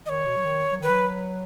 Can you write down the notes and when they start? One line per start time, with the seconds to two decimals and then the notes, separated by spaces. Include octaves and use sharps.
0.06 D#3 C#5 D#5
0.26 B2
0.37 F#3
0.45 D#3
0.72 F#3
0.80 D#3 B4
0.89 F#3